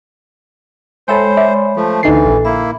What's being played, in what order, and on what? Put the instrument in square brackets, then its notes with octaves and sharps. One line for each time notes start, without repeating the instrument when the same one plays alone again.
[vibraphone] G#3 C#5 B5 [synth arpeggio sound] A4 E5 G5 [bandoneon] C5
[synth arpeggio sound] D5 E5
[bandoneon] F3 A3
[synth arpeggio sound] D2 D#4 C7 [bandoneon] E3 [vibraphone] A4
[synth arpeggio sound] A#1
[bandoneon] A#3 E4 [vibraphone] E5